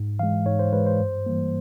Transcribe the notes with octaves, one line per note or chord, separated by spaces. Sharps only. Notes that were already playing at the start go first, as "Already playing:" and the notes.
Already playing: G#2
E3 G#3 F5
G#2 C#5
C5
E3 G#3 B4
C5
G2
E3 G3 A#3